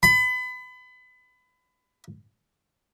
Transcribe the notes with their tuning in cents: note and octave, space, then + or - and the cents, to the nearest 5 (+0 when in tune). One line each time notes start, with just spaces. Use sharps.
B5 +30